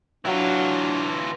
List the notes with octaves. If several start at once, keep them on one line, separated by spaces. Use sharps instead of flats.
E3 F#3 D4 F4